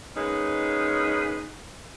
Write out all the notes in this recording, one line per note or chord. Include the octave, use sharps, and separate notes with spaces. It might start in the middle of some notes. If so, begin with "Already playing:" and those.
G#3 A#3 C#4 D#4 B4